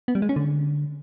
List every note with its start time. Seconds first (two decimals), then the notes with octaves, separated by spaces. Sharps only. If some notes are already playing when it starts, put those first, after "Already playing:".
0.08 B3
0.15 G3
0.22 G#3
0.29 C#4
0.36 D3